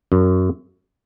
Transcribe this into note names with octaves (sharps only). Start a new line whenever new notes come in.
F#2